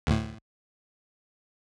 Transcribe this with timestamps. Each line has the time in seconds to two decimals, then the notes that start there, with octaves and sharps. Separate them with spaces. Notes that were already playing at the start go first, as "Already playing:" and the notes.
0.07 D2 A2